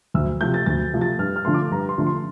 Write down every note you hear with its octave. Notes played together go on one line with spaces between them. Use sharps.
D2 E6
C3 F3 A3 G6
A6
D2 A6
C3 F3 A3
A6
G2 F6
F6
D3 F3 A3 C6
D6
G2 A#5
C6
D3 F3 A3
C6